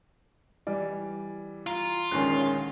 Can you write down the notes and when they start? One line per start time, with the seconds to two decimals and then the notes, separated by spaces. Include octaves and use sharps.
0.67 E3 G3 D5
1.67 F4 A#5
2.12 A#1 D3 D#3 G#3 C#4 F#6 C7